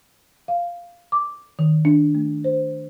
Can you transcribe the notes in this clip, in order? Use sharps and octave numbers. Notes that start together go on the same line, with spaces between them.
F5
D6
D#3
D4
A3
C5